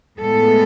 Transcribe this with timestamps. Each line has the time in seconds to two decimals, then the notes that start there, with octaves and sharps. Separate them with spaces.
0.19 A2 G#3 B3 A4